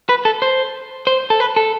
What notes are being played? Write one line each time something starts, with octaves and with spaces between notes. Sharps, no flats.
B4
A4
C5
C5
A4
B4
A4